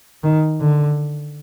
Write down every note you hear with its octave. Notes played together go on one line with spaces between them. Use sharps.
D#3
D3